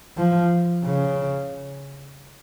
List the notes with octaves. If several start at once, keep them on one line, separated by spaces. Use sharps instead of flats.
F3
C#3